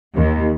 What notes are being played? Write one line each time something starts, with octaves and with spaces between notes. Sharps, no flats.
D#2